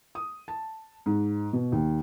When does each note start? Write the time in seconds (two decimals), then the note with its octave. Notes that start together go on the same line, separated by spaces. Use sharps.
0.15 D#6
0.48 A5
1.06 G#2
1.53 B2
1.72 D#2